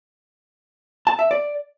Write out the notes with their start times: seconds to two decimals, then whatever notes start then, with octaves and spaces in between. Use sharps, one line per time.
1.07 A5
1.19 E5
1.31 D5